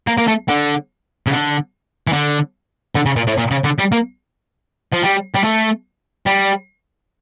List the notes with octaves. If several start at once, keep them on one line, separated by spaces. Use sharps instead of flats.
A#3
A#3
A3
D3
C#3
D3
E3
D3
D3
C#3
A#2
A2
A#2
C#3
D3
G3
A#3
F3
G3
G3
A3
G3